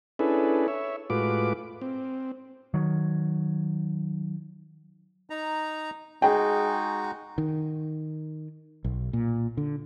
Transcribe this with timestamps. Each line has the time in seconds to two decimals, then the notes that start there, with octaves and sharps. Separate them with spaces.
0.19 C#4 D4 E4 G#4 A4 B4
0.68 C#5 E5
1.10 A2 G#3 F4 F#4 B4 D6
1.81 C4
2.74 D#3 F#3
5.30 D#4 A#5
6.22 G#3 D#4 F#4 G#4 G5
7.38 D#3
8.85 B1
9.13 A#2
9.57 D3